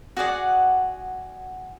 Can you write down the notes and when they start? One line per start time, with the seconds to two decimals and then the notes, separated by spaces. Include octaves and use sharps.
0.17 F#4 G#4 D5 F#5